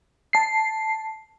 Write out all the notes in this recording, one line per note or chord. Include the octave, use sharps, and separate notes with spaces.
A5 C7